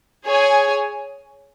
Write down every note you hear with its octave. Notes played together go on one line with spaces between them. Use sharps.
G#4 C#5 G#5